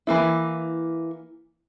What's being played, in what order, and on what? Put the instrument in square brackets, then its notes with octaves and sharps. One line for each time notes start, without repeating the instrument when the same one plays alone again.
[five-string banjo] E3 A#3 E4